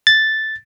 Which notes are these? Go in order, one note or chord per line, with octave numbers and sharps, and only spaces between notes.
A6